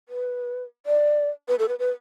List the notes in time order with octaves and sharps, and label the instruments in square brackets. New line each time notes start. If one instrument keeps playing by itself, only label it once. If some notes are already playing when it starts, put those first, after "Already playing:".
[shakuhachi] B4
D5
B4
A4
B4
B4